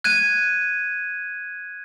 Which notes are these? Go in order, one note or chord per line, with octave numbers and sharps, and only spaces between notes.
F#6 G#6 D#7